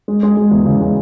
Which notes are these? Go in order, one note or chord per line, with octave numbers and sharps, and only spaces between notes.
G#3
G#3
G#3
E2
C#3
G#3